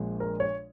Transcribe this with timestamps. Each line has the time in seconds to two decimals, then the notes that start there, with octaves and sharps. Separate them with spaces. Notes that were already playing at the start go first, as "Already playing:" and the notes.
Already playing: A#1 A#2 G#3
0.20 A#4
0.40 C#5